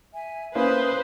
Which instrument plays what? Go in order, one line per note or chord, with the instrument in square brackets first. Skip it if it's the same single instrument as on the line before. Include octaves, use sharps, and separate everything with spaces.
[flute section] E5 G#5
[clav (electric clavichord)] A#3 C#4 E4 [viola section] B4 [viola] C5 [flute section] F5 D#6